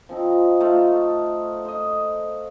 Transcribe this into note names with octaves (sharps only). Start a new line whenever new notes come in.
F3 C4 D#4
A3 D#4 F4 F5
C5 D#5